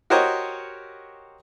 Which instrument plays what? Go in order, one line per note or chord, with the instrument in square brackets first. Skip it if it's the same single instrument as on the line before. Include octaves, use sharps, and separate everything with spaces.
[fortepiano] F#4 G4 A#4 C5 C#5 D#5